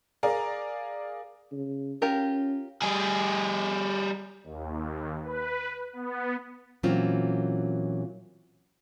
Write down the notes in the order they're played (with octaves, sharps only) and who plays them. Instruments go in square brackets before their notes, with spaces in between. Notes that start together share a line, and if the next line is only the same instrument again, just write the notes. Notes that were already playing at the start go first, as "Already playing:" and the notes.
[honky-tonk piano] G#4 A#4 D5 F5 A#5
[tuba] C#3
[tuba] C#4 [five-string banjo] F4 G4 A#4
[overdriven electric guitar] G3 G#4
[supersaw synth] D#2
B4
B3
[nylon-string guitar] A#2 E3 F#3 C4 C#4 F4